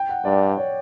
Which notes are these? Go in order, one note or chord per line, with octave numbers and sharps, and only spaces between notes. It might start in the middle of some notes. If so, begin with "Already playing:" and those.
Already playing: G5
F#5
G2 D5
C#5